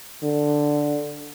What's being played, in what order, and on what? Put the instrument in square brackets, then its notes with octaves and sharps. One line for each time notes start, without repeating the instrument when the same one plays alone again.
[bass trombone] D3